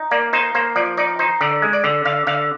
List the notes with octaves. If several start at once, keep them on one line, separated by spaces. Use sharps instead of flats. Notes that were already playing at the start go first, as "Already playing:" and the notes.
Already playing: D#4
A#3 D5
D#4 C5
A#3 C5
F3 D5
D#4 D5
D#4 C5
D3 D5
G#3
D5
D3
D3 F5
D3 F5